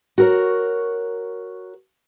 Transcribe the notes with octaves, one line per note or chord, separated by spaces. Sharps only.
F#4 A#4 C#5